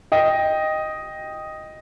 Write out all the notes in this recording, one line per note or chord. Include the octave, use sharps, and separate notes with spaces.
D#5 G5